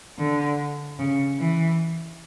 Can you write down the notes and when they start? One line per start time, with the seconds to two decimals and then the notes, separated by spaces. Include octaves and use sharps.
0.19 D3
0.99 C#3
1.39 E3